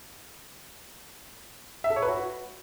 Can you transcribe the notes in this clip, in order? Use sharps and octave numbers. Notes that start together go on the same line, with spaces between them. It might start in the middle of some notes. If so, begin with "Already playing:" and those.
E5
A4
C#5
B4
F#4